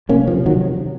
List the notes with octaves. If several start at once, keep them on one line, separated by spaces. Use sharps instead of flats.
C3 A#3 C#4
F3
C3
D#3 F#3